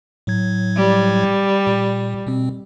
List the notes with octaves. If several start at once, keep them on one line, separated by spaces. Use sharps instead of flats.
A2 F#3 G#6
G3
A#2
B2 C4